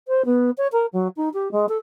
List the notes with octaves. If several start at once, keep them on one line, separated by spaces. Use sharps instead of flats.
C5
B3
C#5
A#4
F#3
D#4
G4
G#3
A4